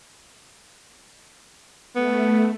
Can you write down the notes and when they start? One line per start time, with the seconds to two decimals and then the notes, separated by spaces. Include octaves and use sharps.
1.96 A3 B3